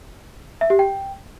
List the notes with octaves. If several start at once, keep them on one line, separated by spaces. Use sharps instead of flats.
E5
G4
G5